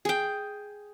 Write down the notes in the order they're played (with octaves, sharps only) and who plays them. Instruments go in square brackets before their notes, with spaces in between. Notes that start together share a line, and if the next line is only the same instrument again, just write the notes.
[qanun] G#4 G5